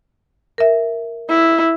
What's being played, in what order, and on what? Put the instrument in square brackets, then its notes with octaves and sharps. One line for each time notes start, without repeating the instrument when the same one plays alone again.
[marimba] A#4 E5
[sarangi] E4